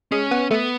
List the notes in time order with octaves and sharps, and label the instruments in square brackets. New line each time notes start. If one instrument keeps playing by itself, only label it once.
[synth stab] G#3 [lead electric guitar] C#4
[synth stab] B3
[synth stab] A3 [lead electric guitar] B3